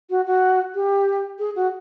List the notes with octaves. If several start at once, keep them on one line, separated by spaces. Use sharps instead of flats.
F#4
F#4
G4
G#4
F#4